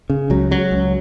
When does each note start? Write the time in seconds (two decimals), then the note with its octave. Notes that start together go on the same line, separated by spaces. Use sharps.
0.10 C#3
0.30 C#2 F#3
0.51 C#3 F#3
0.71 C#2